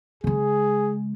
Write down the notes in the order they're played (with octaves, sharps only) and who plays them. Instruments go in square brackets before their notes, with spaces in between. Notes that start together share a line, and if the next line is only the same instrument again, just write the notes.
[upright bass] C#3 G#3 [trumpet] G#4